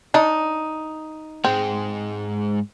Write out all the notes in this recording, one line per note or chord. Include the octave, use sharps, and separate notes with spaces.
D4 D#4
G#2 G#3 C4